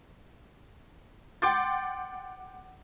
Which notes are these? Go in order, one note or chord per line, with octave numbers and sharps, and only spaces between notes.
F#5 G5 C6 D6 G6 A6